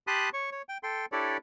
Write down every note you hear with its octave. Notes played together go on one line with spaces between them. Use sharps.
G4 A5 B5 C6 D#6 F#6
C#5 C#6
C#5
G5
A4 G5 C6
D4 E4 G4 A4 C#5 D5